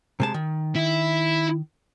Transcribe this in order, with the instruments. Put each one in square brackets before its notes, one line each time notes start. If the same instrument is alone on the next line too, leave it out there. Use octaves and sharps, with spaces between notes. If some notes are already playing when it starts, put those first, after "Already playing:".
[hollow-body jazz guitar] C3 G#3 A5
D#3
[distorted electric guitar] E4